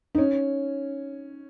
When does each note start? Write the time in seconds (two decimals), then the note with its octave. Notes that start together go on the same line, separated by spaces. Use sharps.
0.15 D#4
0.18 C#4